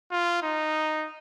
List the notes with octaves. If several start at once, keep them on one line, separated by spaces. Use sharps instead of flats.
F4
D#4